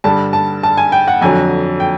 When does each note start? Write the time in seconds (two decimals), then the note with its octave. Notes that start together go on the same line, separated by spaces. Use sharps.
0.04 G2 D3 G3 A5
0.33 A5
0.63 A5
0.77 G#5
0.92 G5
1.08 F#5
1.21 F2 D3 F#3 G#5
1.80 G5